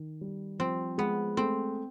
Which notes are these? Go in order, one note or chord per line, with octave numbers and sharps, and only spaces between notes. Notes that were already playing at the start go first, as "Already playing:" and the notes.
Already playing: D#3
G3
F3 C4
G#3 B3
A3 C4